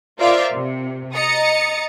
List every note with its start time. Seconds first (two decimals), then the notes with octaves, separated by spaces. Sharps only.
0.19 F4 A#4 C5 D5 E5 F5
0.53 C3
1.14 D#5 A#5 D#6 A6 C#7